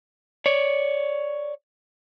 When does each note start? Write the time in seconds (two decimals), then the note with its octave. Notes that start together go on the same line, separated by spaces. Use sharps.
0.46 C#5 D5